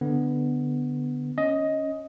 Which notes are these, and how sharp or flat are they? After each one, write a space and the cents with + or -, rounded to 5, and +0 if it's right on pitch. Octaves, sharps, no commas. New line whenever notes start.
D3 +0 B3 +0
C#4 +0 D#5 +10